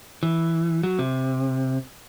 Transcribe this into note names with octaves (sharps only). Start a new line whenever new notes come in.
E3
F#3
C3